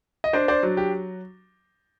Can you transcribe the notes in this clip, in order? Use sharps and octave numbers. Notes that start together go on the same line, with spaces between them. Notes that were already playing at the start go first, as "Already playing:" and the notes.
D#5
D4 C5 D5
C5 D5
F#3
G4